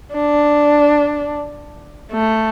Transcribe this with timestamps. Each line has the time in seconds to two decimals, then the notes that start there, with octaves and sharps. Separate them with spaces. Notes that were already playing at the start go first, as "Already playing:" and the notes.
0.13 D4
2.12 A3